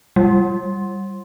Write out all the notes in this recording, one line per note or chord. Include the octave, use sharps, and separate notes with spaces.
G3